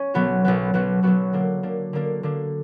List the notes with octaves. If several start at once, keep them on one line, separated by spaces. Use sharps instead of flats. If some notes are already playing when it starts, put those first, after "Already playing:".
Already playing: C#4
B1 B2 F#3 B3 F#4
B1 B2 F#3 B3 F#4
B1 B2 F#3 B3 F#4
B1 B2 F#3 B3 F#4
D3 A#3 D4
D3 A#3 D4
D3 A#3 D4
D3 A#3 D4